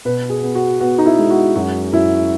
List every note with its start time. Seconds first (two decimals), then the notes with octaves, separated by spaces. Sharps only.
0.05 B2 B4
0.30 G#4
0.43 B3
0.55 F#4
0.81 B3 F#4
0.98 D#4
1.06 E4
1.19 G#3
1.31 F#4
1.55 F#2 F#4
1.93 F#2 E4